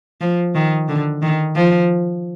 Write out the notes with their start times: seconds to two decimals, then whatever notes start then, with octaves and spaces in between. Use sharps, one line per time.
0.21 F3
0.55 D#3
0.89 D3
1.22 D#3
1.56 F3